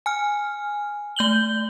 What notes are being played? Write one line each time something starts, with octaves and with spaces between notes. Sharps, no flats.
G#5 F6
A3 G6 F#7 G7